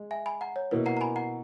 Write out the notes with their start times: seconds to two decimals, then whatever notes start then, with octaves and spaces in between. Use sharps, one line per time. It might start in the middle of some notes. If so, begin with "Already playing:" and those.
Already playing: G#3
0.11 E5 G#5
0.26 G#5 B5
0.41 F#5 A#5
0.56 C#5
0.71 B2 A#3 E4 B4
0.86 F#5 A#5
0.97 A#5
1.01 G#5 B5
1.16 F#5 A#5